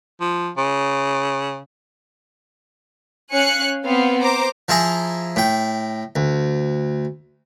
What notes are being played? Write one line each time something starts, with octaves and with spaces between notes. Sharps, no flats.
F3
C#3
C#4 C#5 F5 G#5 F#6 C#7
B3 C4 F5
C5 A#5 D6
F3 E4 G#4 A#5
A2 G5
D2